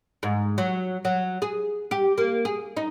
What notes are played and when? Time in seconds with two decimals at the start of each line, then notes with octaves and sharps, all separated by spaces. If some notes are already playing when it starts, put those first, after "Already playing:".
0.23 G#2
0.58 F#3
1.05 F#3
1.42 G#4
1.91 G4
2.18 A#3
2.45 G#4
2.77 D#4